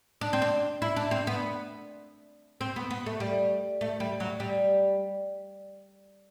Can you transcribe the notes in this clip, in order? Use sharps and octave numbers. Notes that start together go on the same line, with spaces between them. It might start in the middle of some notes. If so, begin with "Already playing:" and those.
D4
C4
D4
E4
D4
C4
B3
C4
B3
B3
A3
G3
A3
G3
F#3
G3